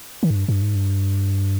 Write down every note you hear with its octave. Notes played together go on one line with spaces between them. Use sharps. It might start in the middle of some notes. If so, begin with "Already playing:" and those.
D#3
G#2
G2
G2
G#2
G2